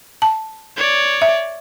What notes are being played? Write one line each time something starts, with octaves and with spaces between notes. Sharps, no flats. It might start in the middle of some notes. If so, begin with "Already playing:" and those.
A5
C#5 D5
E5